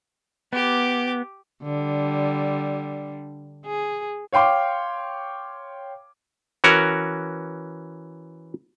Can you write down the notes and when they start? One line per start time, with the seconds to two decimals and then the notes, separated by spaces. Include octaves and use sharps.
0.53 B3 G4 D6
1.63 D3 G3
3.66 G#4
4.33 C#5 F5 G5 C6 D6
6.64 E3 C#4 F#4 A#4